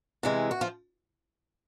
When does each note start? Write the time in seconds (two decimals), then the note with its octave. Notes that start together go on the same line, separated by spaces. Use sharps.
0.23 C3 E3 G#3
0.51 F#4
0.61 F3 F4